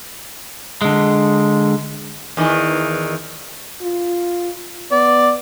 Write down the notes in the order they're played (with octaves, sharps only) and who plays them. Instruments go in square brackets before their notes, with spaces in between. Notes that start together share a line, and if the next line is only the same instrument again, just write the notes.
[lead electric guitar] D3 G#3
[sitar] E2 D#3 E3
[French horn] F4
[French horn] B3 [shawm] D5